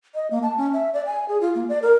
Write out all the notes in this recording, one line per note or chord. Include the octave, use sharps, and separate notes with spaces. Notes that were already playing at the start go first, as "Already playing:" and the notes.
D#5
A#3
A5
C#4
E5
D5
G#5
G#4
F4
A#3
D5
A#4